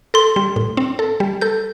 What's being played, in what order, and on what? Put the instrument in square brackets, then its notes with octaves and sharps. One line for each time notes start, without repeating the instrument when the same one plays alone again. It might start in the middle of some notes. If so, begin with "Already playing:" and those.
[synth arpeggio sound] A4 [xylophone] C6
[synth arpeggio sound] G3
A2
C4
A4
G3
[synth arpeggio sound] A4 [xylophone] G6